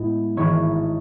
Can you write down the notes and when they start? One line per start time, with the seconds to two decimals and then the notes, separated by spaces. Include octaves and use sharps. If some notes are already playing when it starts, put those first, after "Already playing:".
Already playing: A2 G#3 B3
0.37 G#1 G#2 E3 C#5